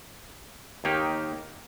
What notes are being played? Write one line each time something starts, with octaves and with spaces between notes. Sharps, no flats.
D#2 D#3 A#3 D#4 G4